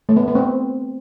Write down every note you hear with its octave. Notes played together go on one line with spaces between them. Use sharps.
A3
B3
B3
C4